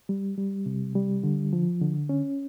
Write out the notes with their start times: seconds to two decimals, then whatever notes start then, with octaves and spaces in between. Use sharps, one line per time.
0.09 G3
0.38 G3
0.66 C3
0.95 G3
1.24 D3
1.53 F3
1.82 D3
2.09 C#4